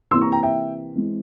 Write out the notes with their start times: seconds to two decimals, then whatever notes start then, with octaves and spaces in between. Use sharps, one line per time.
0.11 C3 E3 A#3 C6 E6
0.21 A#5 C#6
0.32 G5 A#5
0.43 E5 G5
0.95 E3 G#3 C4